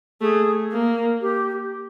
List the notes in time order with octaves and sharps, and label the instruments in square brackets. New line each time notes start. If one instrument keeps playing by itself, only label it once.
[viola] A3 [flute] G#4
[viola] A#3
[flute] G4